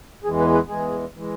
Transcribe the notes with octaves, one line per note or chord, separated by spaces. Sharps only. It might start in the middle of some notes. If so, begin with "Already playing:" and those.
E2 E3 G#3 G#4
B4
B4
E2 E3 G#3 G#4
E3 G#3